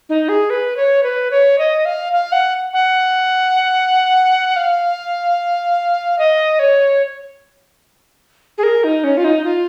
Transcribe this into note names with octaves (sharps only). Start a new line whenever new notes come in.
D#4
G#4
B4
C#5
B4
C#5
D#5
F5
F5
F#5
F#5
F5
D#5
C#5
G#4
A#4
D#4
C#4
F4
D#4
F4